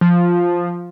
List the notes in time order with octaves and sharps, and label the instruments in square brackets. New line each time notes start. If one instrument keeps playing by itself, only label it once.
[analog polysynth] F3